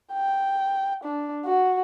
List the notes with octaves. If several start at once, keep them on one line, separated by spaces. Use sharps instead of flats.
G5
D4
F#4